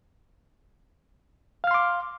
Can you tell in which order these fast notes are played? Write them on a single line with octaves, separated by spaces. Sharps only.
F5 F6 C6 D6